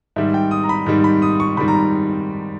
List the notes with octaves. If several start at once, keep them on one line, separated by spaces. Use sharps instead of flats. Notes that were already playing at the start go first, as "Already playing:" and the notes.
G#2 D#3 G3 E5
G5
D#6
A#5
B5
G#2 D#3 G3
B5
D#6
C#6
G#2 D#3 G3 B5
A#5
B5